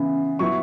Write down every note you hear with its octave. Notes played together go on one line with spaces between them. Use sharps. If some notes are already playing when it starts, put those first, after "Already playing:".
Already playing: C#3 E3 B3 E4
F#3 B3 E4 C#6